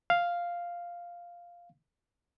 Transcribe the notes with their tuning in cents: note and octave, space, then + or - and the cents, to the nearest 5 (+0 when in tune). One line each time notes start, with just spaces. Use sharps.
F5 +0